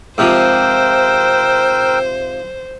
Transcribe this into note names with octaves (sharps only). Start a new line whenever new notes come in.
G#2 C3 F3 A#4 C5 G5 E6